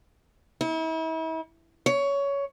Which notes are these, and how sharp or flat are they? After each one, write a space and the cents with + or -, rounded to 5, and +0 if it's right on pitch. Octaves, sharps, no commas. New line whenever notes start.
E4 -40
C#5 +15